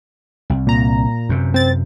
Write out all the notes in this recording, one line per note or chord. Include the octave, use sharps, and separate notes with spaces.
C2
A#2 A#5
F#2 C3
C4 A6